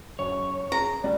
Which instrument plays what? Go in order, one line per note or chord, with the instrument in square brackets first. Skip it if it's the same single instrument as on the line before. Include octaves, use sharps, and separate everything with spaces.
[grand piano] F#1 F#2 [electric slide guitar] C#5
[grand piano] G#4 [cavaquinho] A#5
[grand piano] C#2 G3 D5